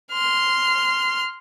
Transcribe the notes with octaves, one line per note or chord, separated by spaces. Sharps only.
C6 F6